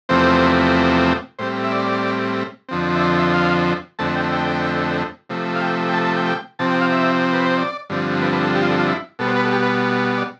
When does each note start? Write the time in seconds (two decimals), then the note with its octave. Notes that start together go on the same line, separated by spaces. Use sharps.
0.09 E2 C3 F3 A3 C4 C5
1.39 A2 G3 C4 C5
1.64 E5
1.72 D5
2.69 F2 D3 F3 C4
2.95 E5
3.02 D5
3.19 E5
3.34 F5
3.99 F2 D3 A3 C4 A5
4.16 G5
4.32 G5
5.29 C3 F3 A3
5.55 F5
5.61 G5
5.89 G5
5.94 A5
6.05 A5
6.17 G5
6.27 G5
6.59 C3 F3 C4 A5
6.70 G5
6.81 F5
6.92 E5
7.33 B4
7.45 C5
7.58 D5
7.90 G2 D3 F3 C4
8.22 B4
8.33 B4
8.44 A4
8.55 G4
8.62 F4
8.70 A4
8.79 F4
8.88 E4
9.19 B2 G3 B3 A4
9.27 C5
9.36 B4
9.45 A4
9.52 G4
9.63 B4
10.18 D5